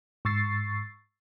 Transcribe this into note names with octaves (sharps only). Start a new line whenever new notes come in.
G#2 C#6 E6 A6 C7